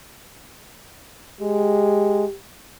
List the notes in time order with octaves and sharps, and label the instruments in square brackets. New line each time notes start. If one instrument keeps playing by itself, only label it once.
[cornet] G#3 [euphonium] G4